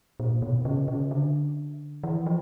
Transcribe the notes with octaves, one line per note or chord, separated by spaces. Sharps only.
A#2
B2
C#3
C#3
D3
E3
F3